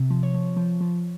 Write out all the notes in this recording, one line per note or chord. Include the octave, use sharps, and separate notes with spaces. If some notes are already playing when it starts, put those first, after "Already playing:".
Already playing: C3
F3
C#5
F3
F3
F3